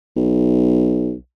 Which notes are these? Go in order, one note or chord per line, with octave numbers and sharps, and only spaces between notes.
B1